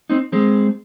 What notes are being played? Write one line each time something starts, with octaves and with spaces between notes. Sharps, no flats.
C4 D#4
G#3 C4